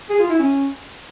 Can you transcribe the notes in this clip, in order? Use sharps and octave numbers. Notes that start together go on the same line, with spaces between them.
G#4
F4
E4
C#4